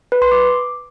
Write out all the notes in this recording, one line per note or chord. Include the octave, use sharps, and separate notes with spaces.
B4
C6
D6